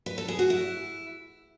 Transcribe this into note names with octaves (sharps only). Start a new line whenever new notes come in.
B4
A4
G#4
F#4
E4